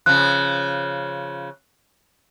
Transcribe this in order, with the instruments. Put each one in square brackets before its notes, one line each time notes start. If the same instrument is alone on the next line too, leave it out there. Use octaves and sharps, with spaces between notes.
[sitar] C#3 F3 [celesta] F#6